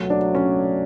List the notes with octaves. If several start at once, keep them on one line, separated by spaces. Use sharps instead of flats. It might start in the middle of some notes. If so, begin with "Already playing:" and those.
Already playing: C#2 B2 F#3 A3
D4
C#4